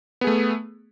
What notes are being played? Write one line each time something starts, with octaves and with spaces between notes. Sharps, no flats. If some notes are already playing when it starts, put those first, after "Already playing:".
A3 B3 G#4